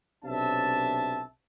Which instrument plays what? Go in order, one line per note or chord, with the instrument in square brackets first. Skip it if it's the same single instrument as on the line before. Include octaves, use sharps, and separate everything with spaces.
[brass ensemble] B1 C3 D4 E5 A5